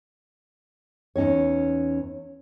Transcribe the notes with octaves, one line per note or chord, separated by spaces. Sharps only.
E2 C#4 D#4 C#5